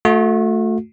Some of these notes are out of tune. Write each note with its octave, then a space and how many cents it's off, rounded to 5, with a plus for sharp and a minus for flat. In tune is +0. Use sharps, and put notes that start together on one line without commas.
A3 +0 F#4 -40